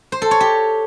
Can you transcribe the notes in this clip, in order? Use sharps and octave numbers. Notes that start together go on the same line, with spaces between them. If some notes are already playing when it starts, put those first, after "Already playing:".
C5
A4
C#5
G4